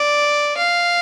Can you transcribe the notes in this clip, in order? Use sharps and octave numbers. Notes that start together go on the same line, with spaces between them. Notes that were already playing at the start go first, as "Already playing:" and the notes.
Already playing: D5
F5